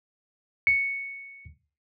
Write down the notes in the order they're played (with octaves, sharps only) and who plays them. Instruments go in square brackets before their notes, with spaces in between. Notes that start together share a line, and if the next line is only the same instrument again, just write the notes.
[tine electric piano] C#7